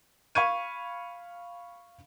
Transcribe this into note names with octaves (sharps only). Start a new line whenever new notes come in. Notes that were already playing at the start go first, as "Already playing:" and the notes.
F5 B5 C#6 G#6 D#7